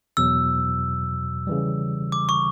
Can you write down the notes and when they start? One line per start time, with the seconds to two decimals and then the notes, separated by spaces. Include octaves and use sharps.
0.17 E2 B2 F#3 E6
1.47 C#3 E3 G3
2.12 D6
2.29 C#6